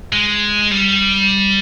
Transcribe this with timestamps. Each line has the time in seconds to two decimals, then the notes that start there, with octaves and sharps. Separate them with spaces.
0.12 G#3
0.71 G3